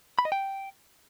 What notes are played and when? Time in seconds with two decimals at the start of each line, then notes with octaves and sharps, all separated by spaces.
0.19 B5
0.25 D#5
0.32 G5